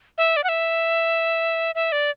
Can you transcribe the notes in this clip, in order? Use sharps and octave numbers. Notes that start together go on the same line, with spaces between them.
E5
D5
F#5
E5
E5
D5